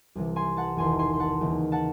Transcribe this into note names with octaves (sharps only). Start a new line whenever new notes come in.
C2 C3 E3
G#5 C6
F#5 A5
E1 E2 D#3 G#5 C6
G#5 C6
C6
F#5 A5
D#2 C#3 E3
F#5 A5